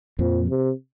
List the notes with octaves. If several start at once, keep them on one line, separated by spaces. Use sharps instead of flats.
F2 A#2 F3
C3